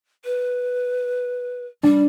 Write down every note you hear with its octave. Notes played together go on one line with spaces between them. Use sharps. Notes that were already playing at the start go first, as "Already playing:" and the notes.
B4
G3 D4